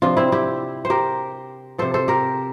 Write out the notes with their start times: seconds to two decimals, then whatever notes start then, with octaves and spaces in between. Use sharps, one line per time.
0.02 C3 F3 D4 F4
0.17 C4 E4
0.32 E4 G4
0.85 C5
0.90 G4 A#4
1.78 C3 F3 A4 C5
1.94 A4 C5
2.08 G4 A#4